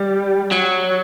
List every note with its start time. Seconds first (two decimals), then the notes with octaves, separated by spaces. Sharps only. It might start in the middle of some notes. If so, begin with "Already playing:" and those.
Already playing: G3
0.52 F#3